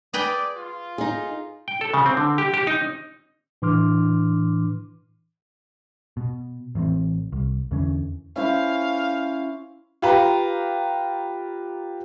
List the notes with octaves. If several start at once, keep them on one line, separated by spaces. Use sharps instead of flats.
G#4 B4 D5 G5
F4
D#4 G#4
G5
A4
C#3
C4
D3
G4
G4
D#4
A2 E3 D4 C6 D6 F6
B2
A1 E3 F#3 C4
C2
E2 D3 E3 C#4
C#4 E4 C5 F5
F4 G4 B4 A#5